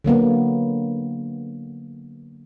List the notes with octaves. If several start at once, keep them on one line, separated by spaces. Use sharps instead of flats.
D3 F#3 A#3 B3